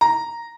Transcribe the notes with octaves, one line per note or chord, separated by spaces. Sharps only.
A#5